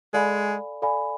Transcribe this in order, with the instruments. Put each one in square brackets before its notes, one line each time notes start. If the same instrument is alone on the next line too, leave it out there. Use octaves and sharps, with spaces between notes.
[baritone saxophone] G#3 [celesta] A4 D5 F5 G#5 B5
[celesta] A4 D5 F5 G#5 B5